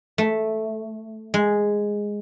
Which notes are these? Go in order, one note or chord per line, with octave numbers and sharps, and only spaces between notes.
A3
G#3